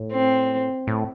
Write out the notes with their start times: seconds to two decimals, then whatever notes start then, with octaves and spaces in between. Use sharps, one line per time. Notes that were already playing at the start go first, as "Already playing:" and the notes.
Already playing: A2
0.12 C4
0.87 A2